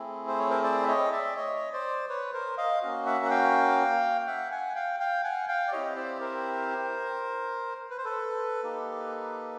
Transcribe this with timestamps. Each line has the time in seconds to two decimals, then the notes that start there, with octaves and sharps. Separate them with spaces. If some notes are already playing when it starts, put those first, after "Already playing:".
Already playing: A3 C4 E4 G#4
0.28 C5
0.39 C#5
0.50 A#4 C5
0.63 C5 D5
0.82 E5
0.88 C#5 D#5
1.12 D5 E5
1.36 C#5 D#5
1.73 C5 D5
2.09 B4 C#5
2.33 A#4 C5
2.58 D#5 F5
2.82 A#3 C#4 F#4
3.06 E5 F#5
3.25 F#5
3.30 F5 G5
4.27 E5 F#5
4.51 F#5 G#5
4.75 F5 G5
5.00 F5 G5
5.24 F#5 G#5
5.48 F5 G5
5.68 D5
5.72 C4 E4 G4 C#5 D#5
5.96 C5 D5
6.20 A#4 C5
7.90 B4
7.98 C5
8.05 A4 B4
8.63 A#3 D#4 G4